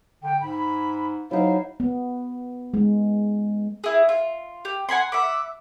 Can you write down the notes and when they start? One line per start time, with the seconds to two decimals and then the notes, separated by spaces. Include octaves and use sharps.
0.23 D3 G5
0.41 G#2 B5
1.31 F#3 D#4 E4 C5 F5
1.80 B3
2.74 G#3
3.84 E4 G#4
4.09 F4
4.65 G4
4.89 F#5 G#5 B5 C6
5.12 E5 F#5 B5 D6